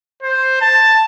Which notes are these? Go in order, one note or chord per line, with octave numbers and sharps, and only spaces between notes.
C5
A5